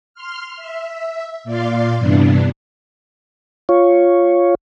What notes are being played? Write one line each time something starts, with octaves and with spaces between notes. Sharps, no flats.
C6 F6
E5
A#2 D5 F5 C6
G2 C3 E3 B3 D4
F4 C#5